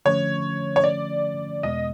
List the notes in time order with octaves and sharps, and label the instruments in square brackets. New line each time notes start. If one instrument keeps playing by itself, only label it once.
[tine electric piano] D3 F3 A3 C#4 [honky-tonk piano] C#5
[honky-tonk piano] C#5
D5
[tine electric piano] E2 B2 G#3 B3 [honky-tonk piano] D#5